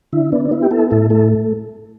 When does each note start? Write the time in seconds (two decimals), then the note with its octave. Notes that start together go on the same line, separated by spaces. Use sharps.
0.13 D3 E4
0.32 B3 D4
0.45 D4
0.51 B3 E4
0.62 G4
0.71 B3 E4 A4
0.91 A2 E4 A4
1.10 A3 E4 A4